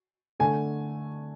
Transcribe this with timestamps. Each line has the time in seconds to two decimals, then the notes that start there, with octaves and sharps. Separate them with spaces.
0.39 D3 A3 G#5